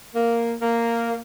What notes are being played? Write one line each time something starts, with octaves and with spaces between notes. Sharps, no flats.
A#3
A#3